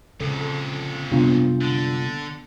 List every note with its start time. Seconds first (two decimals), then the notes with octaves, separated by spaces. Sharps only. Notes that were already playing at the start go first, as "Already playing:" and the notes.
0.20 F2 A#2 C#3 A4
1.12 F#2 C3 G3 A#3 B3 D4 F4
1.61 D3